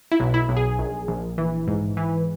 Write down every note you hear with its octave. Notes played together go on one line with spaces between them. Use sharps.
E4
B1
E4
B1
G#4
A#1
A#1
E3
G#2
E3